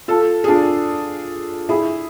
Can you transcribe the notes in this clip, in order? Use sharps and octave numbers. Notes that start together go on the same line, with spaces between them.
F4 A4
G#4
D4 F4
E4 G#4